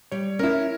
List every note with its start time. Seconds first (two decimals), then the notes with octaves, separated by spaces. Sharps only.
0.12 G3 C#5
0.39 C#4 E4 A#4